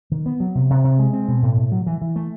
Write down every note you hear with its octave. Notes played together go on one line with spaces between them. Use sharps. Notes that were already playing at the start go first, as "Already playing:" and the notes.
D#3
B3
F#3
C3
C3
C3
G#3
C4
B2
A2
A2
F#3
E3
E3
A3